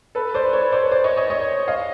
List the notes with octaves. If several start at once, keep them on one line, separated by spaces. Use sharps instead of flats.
A4 B4
C5 D5
B4 C#5
C5 D5
C5 D5
C#5 D#5
C#5 D#5
C#5 D#5
D#5 F5